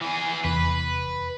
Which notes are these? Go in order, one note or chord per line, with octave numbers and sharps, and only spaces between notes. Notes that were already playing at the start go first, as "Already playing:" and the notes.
E3 G#4
F1 E2 B4